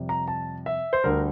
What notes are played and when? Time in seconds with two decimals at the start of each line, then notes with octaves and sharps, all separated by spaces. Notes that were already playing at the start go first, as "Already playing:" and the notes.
Already playing: F2 C3 G3
0.09 A#5
0.28 A5
0.66 E5
0.93 C5
1.04 D2 D3 G3 A#4